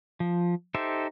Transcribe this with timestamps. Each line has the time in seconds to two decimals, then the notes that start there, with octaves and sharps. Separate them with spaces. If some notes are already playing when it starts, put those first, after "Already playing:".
0.20 F3
0.74 D#4 G4 A4 C5 E5